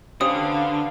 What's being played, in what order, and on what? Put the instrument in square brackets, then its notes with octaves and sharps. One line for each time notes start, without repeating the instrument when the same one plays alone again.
[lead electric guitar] D3 [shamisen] C#4 G4 C5 [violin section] B4 F5 [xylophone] D#6